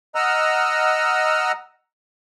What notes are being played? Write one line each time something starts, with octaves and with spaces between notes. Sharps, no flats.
D#5 F#5 A#5 E6 F6